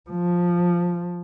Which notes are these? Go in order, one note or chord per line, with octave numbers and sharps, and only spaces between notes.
F3